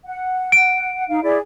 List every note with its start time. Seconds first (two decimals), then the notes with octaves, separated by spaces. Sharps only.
0.05 F#5
0.52 D7
1.09 D#4 F5
1.23 E4 G#4 D5